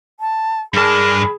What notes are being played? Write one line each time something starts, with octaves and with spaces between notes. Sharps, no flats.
A5
G2 G#3 D4 G#4 A#4 A5 B5